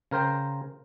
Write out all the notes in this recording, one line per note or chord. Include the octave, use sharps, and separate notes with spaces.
C#3 A#4 C5 G5 A#5